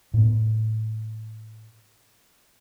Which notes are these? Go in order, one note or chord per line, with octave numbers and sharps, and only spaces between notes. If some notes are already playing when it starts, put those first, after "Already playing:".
A2 B3